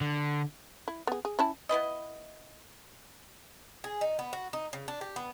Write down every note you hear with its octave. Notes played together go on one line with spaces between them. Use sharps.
D3
E4
B3 G#4
G#4
C#4 E4 A5
B3 E4 B4 D#5
G#4
D#4
B3
F#4
D#4
C#3
D4
G4
B3